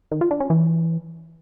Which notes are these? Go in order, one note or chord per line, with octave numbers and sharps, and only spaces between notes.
D#3
F4
D4
C#4
E3